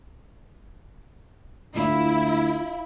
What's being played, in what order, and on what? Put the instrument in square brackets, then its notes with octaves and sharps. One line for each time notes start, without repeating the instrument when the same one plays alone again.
[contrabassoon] D2 [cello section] E4 [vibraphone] F4 F5